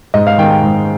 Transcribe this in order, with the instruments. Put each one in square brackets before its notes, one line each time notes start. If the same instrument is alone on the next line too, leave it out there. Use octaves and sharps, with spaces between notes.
[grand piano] G#2 D#5
F5
D#3 G#3 G5
G5
G#2